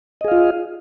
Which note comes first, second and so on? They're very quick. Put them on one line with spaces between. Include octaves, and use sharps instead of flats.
D#5 G#4 F5 F4